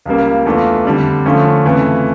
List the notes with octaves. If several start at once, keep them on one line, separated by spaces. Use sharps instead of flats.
C#2 C#3 G3 A#3
E2 E3 A3 D4 F4
F2 D3 G3 D4
D3 F3 A3 C#4
F2 C#3 E3 A3